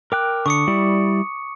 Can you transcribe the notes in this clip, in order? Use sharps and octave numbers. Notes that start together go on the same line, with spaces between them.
A#4 G5 D6 F#6
D3 C#6 D#6 C#7
G3 E4 D5